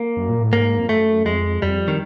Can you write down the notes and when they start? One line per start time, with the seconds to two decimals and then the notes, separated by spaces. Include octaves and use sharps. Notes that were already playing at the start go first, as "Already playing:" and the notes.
Already playing: A#3
0.17 F#2
0.29 A#2
0.40 A2
0.52 G#2 A#3
0.78 F2
0.89 F#2 A3
1.25 F2 G#3
1.62 F2 G3
1.88 D#3